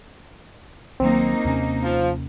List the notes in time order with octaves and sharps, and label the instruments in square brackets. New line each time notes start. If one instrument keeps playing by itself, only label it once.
[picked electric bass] C2 D#3 F#3 [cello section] A#3 D#4 [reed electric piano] C4
[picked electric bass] D#2 C3 C#4
[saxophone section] F3